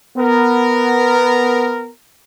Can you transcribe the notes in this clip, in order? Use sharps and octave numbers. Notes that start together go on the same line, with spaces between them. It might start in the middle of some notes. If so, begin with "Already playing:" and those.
B3 A#4